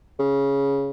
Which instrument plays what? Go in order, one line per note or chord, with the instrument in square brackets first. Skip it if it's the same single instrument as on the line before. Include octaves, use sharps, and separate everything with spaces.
[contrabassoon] C#3